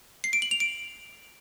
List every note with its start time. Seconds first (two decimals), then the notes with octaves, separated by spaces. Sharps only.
0.24 C7
0.33 D7
0.42 F#7
0.51 F7
0.60 D7